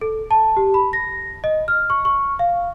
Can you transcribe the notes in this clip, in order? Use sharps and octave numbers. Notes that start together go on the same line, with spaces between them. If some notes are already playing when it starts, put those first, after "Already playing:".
A4
A5
G4
B5
A#6
D#5
F6
C#6
C#6
F5